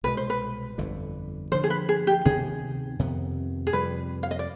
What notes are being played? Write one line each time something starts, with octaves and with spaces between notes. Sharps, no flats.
C2 B2 G#3 B4
C5
B4
G1 F2 D3
G2 D3 F3 C5
G#4
B4
G#4
G4
D2 C3 D#3 B3 G#4
F2 C3 D#3 B3
G#4
F2 C3 G3 B4
F5
D#5
D5